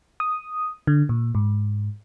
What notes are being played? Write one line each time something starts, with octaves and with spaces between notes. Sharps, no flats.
D#6
D3
A#2
G#2